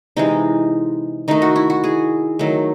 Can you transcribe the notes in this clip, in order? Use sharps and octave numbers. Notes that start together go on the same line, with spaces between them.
C3 E3 G#3 D#4
D#3 A3 D#4
F#4
E4
F#4
G#4
D#3 F#3 A3